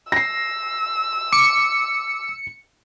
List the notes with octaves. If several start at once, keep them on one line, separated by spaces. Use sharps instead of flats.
E6 A#6 C7
D6 C#7